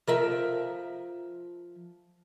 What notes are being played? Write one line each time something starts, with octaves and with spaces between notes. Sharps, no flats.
F3 A#4 E5